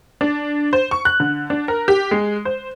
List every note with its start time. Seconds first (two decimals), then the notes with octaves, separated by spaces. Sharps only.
0.21 D4
0.73 C5
0.91 C#6
1.05 F#6
1.20 D3
1.50 D4
1.68 A#4
1.88 G4
2.11 G#3
2.45 C5